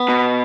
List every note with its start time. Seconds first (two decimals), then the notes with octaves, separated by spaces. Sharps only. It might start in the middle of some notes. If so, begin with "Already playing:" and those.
Already playing: B3
0.09 B2